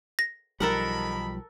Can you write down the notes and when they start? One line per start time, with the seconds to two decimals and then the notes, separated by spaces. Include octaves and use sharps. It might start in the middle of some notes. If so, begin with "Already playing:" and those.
0.19 A#6
0.60 B1 D#3 F3 G3 A4 A#4 F#5 B5